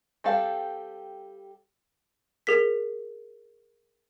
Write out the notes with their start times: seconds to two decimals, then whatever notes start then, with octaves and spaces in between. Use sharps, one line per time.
0.24 G3 C4 G4 A4 F5
2.47 G#4 A#4 B6